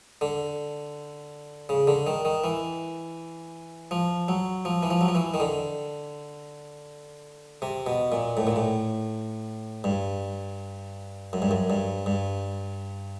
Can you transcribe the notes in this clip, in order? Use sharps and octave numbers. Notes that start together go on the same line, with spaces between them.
D3
C#3
D3
D#3
D#3
E3
F3
F#3
F3
E3
F3
F#3
F3
E3
D#3
D3
C3
B2
A#2
A2
A#2
A2
G2
F#2
G2
F#2
G2
G2